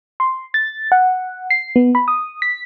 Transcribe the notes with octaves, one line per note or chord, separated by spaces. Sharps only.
C6
A6
F#5
C7
B3
B5
D#6
B6